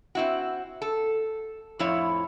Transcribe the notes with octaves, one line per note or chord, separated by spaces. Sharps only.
C4 E4 F#4
A4
F2 A2 F3 E4 C#5